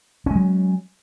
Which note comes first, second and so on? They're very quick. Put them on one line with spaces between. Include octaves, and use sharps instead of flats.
C#4 G#3 F#3